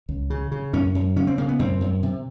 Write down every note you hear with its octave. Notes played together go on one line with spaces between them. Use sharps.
C#2
C#3
C#3
F#2 C#4
F#2
C#3 C#4
C4
C#3 A#3
B3
F#2 C4
F#2
C3